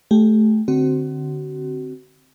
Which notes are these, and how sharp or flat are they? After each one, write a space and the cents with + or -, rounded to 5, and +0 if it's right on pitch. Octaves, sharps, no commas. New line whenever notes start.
A3 -20 G4 +0
D3 +0 C4 +0 F#4 +30